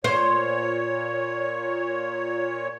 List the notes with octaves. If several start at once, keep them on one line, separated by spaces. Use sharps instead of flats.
A#2 C5 C#5